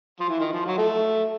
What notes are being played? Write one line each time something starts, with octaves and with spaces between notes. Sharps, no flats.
F3
E3
D#3
F3
F#3
A3